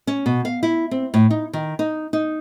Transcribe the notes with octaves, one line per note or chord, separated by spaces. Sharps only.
C#4
B2
F5
E4
C4
A2
D#4
D#3
D#4
D#4